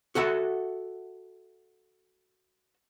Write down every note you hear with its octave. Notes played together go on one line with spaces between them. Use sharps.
F#4 A4 E5 F#5